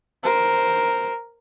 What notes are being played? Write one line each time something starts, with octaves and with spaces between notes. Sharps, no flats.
A#4 C5